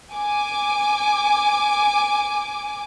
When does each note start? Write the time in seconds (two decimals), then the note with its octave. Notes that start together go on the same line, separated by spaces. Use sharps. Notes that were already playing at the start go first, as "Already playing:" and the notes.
0.14 G#5 D6